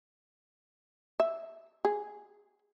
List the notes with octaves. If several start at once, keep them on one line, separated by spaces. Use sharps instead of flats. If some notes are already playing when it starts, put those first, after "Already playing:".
E5
G#4